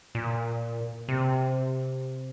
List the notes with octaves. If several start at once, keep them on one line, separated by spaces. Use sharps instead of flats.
A#2
C3